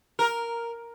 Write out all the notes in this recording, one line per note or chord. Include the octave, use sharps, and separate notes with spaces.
A#4